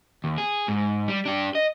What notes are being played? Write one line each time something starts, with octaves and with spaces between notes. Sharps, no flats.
D#2
G#4
G#2
G3
D4 G4
D#5